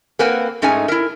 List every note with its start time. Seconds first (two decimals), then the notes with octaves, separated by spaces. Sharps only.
0.19 A#3 C4 A#4 B4 F#5 G#5
0.62 G#2 A3 C#4 D#4 G#4 G#5
0.88 E4 A#4